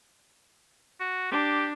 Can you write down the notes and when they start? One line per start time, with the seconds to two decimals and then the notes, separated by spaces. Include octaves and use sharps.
1.00 F#4
1.32 D4 G4